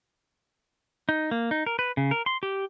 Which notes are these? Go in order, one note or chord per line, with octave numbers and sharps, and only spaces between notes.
D#4
A#3
D#4
A#4
B4
C#3
A#4
C6
G4